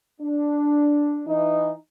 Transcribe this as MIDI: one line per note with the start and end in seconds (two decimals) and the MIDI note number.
0.21 1.22 62
1.27 1.71 52
1.27 1.71 63